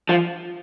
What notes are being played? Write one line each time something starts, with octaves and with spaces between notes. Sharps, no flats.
F3